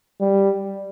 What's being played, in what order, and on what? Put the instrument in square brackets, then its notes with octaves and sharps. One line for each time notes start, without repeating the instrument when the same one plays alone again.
[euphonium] G3